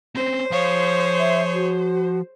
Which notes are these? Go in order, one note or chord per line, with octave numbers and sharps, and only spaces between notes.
C4 C#4 C5
F3 G#4 C#5 F5
E5
F#4